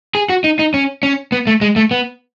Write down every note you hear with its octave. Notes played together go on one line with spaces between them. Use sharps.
G#4
F#4
D#4
D#4
C#4
C#4
B3
A3
G#3
A3
B3